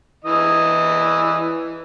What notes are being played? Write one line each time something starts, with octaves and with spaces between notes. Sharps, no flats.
E3 D#5